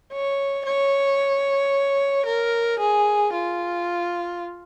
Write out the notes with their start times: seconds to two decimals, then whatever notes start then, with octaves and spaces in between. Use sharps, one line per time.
0.12 C#5
0.66 C#5
2.26 A#4
2.79 G#4
3.33 F4